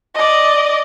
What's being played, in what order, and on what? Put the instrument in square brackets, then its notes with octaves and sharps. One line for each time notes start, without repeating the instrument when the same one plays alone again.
[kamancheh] D5 D#5